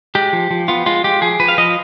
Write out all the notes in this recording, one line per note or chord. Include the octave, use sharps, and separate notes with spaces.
G#3 G4
F3
F3
B3 F4
G#3 F4
G#3 G4
F3 G#4
F3 B4
F5
F3 D#5